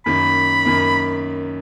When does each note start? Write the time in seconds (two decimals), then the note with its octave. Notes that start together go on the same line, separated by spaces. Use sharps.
0.06 F#2 D#3 A#3 B5
0.65 F#2 D#3 A#3